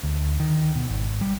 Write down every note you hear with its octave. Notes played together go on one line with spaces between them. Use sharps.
D2
D#3
B2
G#1
G3